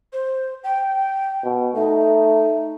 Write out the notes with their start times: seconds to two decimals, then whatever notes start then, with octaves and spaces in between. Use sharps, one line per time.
0.13 C5
0.64 G5
1.44 B2
1.75 A3 D#4